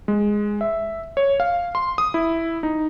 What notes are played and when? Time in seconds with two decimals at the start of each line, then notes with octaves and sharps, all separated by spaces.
0.08 G#3
0.61 E5
1.17 C#5
1.40 F5
1.75 C6
1.98 D#6
2.14 E4
2.63 D#4